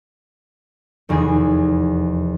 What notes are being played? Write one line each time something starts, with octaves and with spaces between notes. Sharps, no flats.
F1 E2 D#3 G#4 G#6 A#6